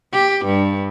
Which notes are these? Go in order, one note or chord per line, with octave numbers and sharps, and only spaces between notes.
G4
G2